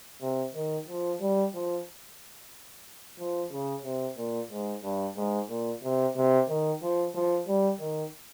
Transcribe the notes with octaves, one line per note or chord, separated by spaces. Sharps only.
C3
D#3
F3
G3
F3
F3
C#3
C3
A#2
G#2
G2
G#2
A#2
C3
C3
D#3
F3
F3
G3
D#3